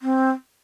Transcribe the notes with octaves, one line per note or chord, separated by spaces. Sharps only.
C4